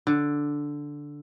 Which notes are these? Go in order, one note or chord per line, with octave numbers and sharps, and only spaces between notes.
D3